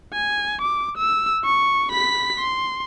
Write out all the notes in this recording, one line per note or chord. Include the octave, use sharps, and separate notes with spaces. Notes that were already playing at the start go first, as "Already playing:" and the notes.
G#5
D6
E6
C#6
B5 B6
C6